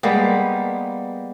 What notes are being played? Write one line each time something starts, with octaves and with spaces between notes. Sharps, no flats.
G3 G#3 A#3 B3